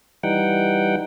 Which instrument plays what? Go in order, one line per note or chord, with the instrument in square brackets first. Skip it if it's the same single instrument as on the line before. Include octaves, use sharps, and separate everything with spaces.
[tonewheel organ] E3 G3 D#4 F#5 G5